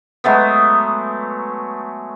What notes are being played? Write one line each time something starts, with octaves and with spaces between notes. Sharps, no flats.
F#3 G#3 A3 B3